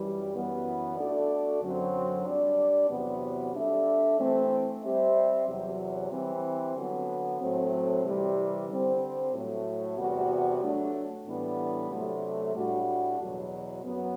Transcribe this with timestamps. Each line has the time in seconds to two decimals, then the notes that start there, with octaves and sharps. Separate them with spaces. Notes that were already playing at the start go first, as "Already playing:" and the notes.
Already playing: F#2 E3 G3
0.32 F#2 E3 B3
0.96 A3 D4 F#4 A4 D5
1.61 F#2 D3 F#3 C4
2.25 G3 D4 G4 D5
2.89 E2 C3 F#3 B3
3.53 G3 D4 A4 E5
4.18 E3 A3 C4
4.82 G3 C4 G4 C5 E5
5.47 E2 C3 F#3
6.11 E3 G3 C4
6.75 D3 F#3 B3
7.40 A2 F#3 A3 C4
8.04 C3 E3 G3
8.68 D3 G3 C4
9.32 A2 F#3 A3
9.97 E2 C3 G3 B3 F#4
10.61 F#3 A3 D4
11.25 A2 E3 G3 B3 D4
11.90 C3 F#3 A3 D4
12.54 A2 G3 D4 F#4
13.18 E2 B2 F#3
13.82 F#2 F#3 B3